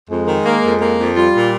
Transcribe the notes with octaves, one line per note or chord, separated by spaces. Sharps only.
F2 G#3
D#3
A#3
F2
A#3
F2
G3 F4
A#2